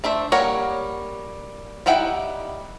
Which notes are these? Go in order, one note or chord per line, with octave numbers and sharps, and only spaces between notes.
A3 D4 C5 E5
G3 A#3 A#4 C#5 F#5
G3 D#4 E4 F#5 G5